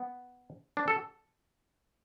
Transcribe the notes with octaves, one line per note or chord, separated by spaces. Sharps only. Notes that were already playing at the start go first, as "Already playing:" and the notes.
Already playing: B3
D4
A4